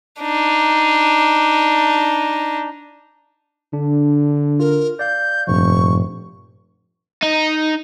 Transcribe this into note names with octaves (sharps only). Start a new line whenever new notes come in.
D4 D#4
D3 D4
F4 A#4
D5 F5 G6
F1 G2 A#2 F3 C#6
D#4